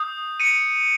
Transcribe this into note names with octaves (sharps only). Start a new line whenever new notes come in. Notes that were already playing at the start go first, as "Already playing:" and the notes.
Already playing: D#6 G6
C#7 D#7